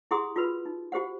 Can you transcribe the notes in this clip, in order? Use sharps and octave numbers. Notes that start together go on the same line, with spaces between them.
E4 G4 G#4 F#5 C6 D#6
F4 F#4 A#4 B4 B5
D#4
F#4 G4 C5 F#5